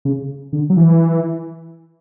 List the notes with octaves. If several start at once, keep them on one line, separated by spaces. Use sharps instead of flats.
C#3
D3
F#3
E3